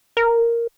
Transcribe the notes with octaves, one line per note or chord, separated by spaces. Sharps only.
A#4